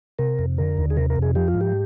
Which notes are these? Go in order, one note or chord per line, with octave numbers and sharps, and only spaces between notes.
C3 A#4
F2
D3 A#4
D#2
G#4
C3 A#4
A#4
F2
G#4
F3 G4
F4
G#2
G4